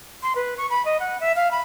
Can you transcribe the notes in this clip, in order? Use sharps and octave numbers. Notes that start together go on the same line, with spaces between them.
C6
B4
C#6
B5
D#5
F#5
E5
F5
B5